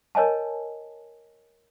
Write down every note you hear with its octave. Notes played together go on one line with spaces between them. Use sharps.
A#4 C#5 D#5 G#5 A5